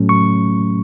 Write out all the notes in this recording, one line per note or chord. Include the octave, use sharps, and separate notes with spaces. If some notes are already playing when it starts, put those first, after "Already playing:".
Already playing: A2 F#3 A3 C#4
C#6